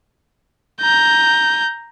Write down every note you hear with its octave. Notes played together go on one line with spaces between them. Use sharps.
A#5 G6